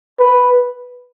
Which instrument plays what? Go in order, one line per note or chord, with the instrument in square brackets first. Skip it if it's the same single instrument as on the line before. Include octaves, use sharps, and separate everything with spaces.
[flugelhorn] B4